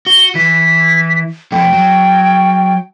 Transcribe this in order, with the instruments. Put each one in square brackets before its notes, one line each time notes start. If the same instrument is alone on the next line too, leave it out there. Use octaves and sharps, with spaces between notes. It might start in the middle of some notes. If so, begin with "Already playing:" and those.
[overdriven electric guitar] F#4 [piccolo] G7
[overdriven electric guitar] E3 [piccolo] B6
[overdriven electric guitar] F2 A3 [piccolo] G5
[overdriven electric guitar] F#3